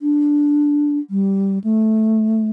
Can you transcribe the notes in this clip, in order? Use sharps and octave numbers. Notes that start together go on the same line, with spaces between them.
D4
G3
A3